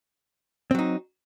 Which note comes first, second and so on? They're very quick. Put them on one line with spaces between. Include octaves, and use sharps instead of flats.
C4 F#3 D#4